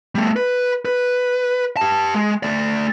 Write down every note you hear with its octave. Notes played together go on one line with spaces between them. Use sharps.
G3 A3
B4
B4
G4 A5
G#3
A3 D5